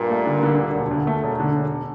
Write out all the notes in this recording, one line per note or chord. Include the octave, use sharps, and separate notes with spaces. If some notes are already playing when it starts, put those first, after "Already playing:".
Already playing: G2 A#2
A3
D3
D3
D2
E1
D2
A3
E1
D3
E1